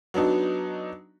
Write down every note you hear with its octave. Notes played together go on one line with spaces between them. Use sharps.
F#3 B3 D4 D#4 F#4